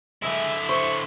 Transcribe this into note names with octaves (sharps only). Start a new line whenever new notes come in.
D3 G#3 E4 E5
C5 C#6